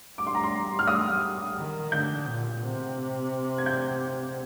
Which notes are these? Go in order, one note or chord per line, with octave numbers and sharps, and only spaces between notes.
G3 D6
C6
A#5
C6
F6
D#6
D#3
D3 G6
A#2
C3
G#6
G6